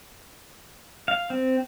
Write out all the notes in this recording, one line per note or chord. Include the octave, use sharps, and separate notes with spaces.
F5
C4